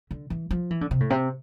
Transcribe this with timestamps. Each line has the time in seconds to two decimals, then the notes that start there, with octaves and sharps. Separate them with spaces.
0.11 D3
0.30 E3
0.51 F3
0.71 E3
0.81 D3
0.91 C3
1.00 A2
1.10 C3